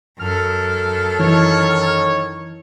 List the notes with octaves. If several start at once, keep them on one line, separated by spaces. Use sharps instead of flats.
F#2 A4 F6
D#3 E3 C#5